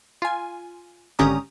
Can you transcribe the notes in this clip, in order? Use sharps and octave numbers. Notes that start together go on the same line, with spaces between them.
F4 G#5
G#1 D3 C#4 G4 A#5 D#6